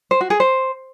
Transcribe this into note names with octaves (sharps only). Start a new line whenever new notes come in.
C5
F#4
G#4
C5